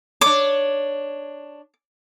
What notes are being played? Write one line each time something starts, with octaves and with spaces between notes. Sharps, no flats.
D4 C#5 D6